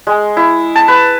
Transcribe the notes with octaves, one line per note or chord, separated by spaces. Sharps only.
G#3
E4
A5
B4